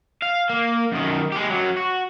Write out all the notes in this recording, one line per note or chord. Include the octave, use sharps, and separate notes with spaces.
F5
A#3
F#2 D#3
G#3 G4
F#2 F#3
F#4